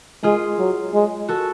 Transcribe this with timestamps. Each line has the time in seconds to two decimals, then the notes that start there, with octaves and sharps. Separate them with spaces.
0.23 G#3 F4 G#4
0.59 F#3
0.94 G#3
1.28 F#4 A4